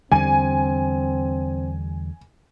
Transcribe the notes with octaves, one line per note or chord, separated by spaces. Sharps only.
E2 D3 G3 C4 G#5